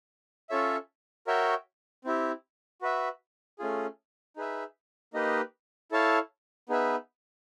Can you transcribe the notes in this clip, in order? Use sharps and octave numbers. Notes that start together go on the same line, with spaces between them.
C#4 F4 A4 C#5 E5
F#4 A#4 C#5 E5 G5
C4 E4 G4
F#4 B4 E5
A3 C#4 F4 G#4
D#4 G#4 B4 E5
A#3 D#4 G4 B4 D#5
E4 A4 C#5 F5 A5
B3 D#4 G#4 B4 E5